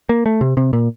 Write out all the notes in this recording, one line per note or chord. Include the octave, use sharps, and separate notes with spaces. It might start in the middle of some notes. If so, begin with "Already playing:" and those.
A#3
A3
C3
C3
A#2